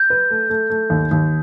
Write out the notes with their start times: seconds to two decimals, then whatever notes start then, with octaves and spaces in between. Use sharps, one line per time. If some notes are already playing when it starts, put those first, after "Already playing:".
Already playing: G6
0.10 B4
0.30 A3
0.50 A3
0.70 A3
0.90 D#2
1.11 D#2